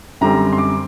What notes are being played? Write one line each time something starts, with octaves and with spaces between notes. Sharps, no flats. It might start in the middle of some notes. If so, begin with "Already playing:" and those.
F#2 D3 G3 C4 A#5
C6
D6